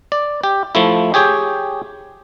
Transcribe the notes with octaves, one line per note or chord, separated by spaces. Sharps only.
D5
G4
F3 A3 E4
G4 G#4 C#5 G5